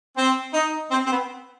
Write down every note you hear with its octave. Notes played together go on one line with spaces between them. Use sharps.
C4
D#4
C4
C4
B3